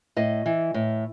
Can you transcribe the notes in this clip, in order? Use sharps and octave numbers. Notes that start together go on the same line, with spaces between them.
A2 D#5
E3
A2